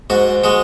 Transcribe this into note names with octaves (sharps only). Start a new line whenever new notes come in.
G#2 F#4
G#3 F#4